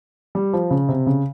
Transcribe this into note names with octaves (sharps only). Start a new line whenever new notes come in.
G3
F3
C#3
C3
C#3